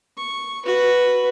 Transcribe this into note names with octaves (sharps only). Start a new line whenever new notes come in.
C#6
F#4 B4